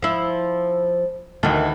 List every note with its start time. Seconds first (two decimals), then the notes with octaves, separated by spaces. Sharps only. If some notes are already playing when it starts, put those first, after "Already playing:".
0.02 F3 E4
1.43 D2 D#3 E3